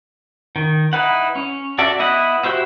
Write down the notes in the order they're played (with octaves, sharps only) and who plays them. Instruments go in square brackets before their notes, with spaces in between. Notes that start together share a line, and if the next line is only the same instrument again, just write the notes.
[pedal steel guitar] D#3
D#4 E4 B4 F#5
C#4
F#4 A4 D5 E5
B3 E4 D#5 E5 F#5
E4 F#4 G4 C5 E5